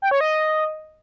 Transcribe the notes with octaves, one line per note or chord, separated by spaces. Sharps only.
G5
C#5
D#5